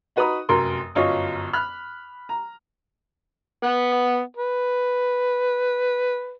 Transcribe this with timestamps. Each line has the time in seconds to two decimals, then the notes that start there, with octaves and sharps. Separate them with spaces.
0.16 D#4 F#4 B4 A#5 B5 D#6
0.49 F1 F#2 A#4 C6
0.95 G1 F#2 C#4 F4 C#5 D#5
1.53 B5 F6 F#6
2.29 A#5
3.63 B3 F#5
4.37 B4